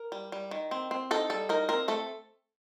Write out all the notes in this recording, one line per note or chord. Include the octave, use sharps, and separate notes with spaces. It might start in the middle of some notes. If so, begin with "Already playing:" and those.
Already playing: A#4
G3
G3
D#3
C4
C4
D#4 A4
G3 A4
D#4 A#4
C4 A#4
A3 A4